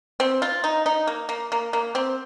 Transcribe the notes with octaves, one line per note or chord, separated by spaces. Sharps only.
C4
F4
D#4
D#4
A#3
A#3
A#3
A#3
C4